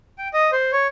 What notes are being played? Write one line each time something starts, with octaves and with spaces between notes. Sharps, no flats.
G5
D#5
C5
C#5